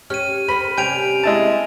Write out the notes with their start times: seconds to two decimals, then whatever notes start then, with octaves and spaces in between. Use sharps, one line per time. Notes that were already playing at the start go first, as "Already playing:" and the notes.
0.10 C#4 G4 F6 D#7
0.48 A#4 C5 B5
0.78 C3 G3 C#4 G5 G#5 D7 F7
1.23 G#3 E4 A5